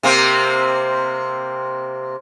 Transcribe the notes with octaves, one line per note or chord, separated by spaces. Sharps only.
C3 A#3 C4